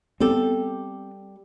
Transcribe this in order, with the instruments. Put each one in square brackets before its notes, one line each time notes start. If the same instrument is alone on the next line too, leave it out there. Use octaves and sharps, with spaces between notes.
[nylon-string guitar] G3 G4 A4 [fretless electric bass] B3 C4